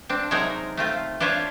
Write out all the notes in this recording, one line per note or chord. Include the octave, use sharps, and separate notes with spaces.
C4 D4
C3 F#3 G#3 D#4 G#4 A#4
A3 C4 F4
D4 F4 C5 C#5 E5